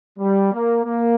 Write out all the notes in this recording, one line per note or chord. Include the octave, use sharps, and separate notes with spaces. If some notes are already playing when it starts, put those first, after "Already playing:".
G3
A#3
A#3